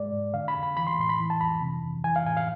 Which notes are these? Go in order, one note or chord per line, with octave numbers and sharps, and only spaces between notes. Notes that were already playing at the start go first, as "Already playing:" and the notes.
Already playing: G#2 G#3 D5
G#2
D3 F5
B5
F2
B5
E3 B5
C6
A2 C6
B5
E3
A5
F2 B5
C3
F2
E3 G#5
F5
A2 G#5
F5